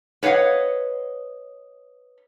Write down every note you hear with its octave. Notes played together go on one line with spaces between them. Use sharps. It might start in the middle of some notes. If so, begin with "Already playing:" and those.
B4 C#5 D#5 F5 F#5